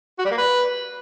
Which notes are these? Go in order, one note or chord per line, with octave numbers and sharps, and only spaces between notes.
F#4
G3
A#3
B4